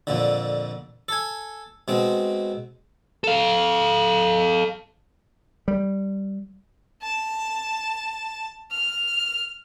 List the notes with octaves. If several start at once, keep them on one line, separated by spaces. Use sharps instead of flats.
F2 A#2 D3
A4 G#5
B2 G#3 C4
A4 F5
G3
A5
F6